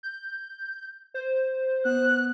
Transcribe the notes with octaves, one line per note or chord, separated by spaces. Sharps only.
G6
C5
B3 F#6